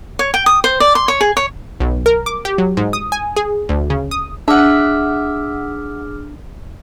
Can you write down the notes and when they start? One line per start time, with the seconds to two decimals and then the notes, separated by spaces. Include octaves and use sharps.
0.19 C#5
0.34 G5
0.46 D#6
0.64 C5
0.80 D5
0.95 C6
1.08 C#5
1.21 G#4
1.37 C#5
1.80 B1
2.06 A#4
2.26 D6
2.45 G4
2.58 F#3
2.77 G#2
2.93 D#6
3.12 G#5
3.36 G#4
3.69 D2
3.90 C#3
4.11 D#6
4.48 D4 G#4 E5 F#5 D6 F6